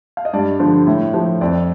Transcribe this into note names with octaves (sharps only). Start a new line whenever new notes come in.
F5
D#5
G2 D5
D3 F3
A2
F3
F2 D5